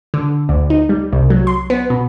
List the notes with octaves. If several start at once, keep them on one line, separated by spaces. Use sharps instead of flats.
D3
D2
D#4
G3
C2
F#3
C6
B3
B2